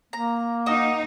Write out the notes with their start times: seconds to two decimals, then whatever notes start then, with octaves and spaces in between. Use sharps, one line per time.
0.13 A#3 A#5
0.66 D#4 F#4 D#5